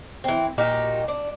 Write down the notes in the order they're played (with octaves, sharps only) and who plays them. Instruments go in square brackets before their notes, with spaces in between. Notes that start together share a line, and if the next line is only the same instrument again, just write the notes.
[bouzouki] E3 C4
A#2 D#4 F#4 G4
D4